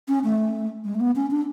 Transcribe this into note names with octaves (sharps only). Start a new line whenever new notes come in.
C#4
A3
G#3
A3
B3
C#4
D4